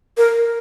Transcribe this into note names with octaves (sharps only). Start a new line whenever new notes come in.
A#4